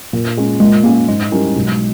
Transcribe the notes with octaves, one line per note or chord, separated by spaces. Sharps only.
A#2
G#3 C#4
A#2 G#3
G#3 A#3 C#4 G#4
G#2 G#3
G3 C#4 E4 A#4
B1